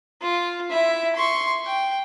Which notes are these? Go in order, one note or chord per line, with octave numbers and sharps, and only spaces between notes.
F4
E4 E5
C6 C#6
G5